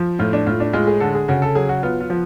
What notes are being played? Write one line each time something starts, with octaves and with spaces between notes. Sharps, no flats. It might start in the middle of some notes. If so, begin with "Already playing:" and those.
Already playing: F3
A2 F4
D4
A2 F4
D4
G#3 F4
G#4
D3 A4
G#4
C#3 F#4
A4
F#3 G#4
F#4
B3 F4
F4
F3